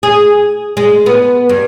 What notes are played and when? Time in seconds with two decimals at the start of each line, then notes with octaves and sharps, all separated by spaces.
0.03 G#4
0.77 G#3
1.06 B3
1.49 G2